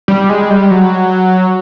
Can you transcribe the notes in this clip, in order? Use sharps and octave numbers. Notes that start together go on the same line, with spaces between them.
G3
G#3
G3
F#3